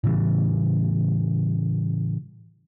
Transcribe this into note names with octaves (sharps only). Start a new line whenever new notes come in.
A2 C#3 E3 G3